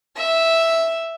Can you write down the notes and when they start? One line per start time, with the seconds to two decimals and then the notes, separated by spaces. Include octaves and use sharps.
0.16 E5